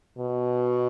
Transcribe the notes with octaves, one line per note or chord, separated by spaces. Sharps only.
B2